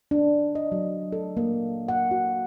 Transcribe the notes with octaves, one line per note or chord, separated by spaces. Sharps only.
D4
D#5
F#3
A4
A#3
F#5
F#4